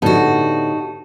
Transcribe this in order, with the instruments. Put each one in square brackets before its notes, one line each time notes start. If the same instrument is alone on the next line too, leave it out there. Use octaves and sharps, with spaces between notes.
[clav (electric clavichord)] A2 D3 B3 [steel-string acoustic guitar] D#4 F#4 [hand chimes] G4 A5